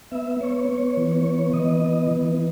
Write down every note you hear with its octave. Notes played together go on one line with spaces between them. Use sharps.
B3 E5
B3 C#5
B3 C#5
E3
C#5
B3
E3 D#5
B3
E3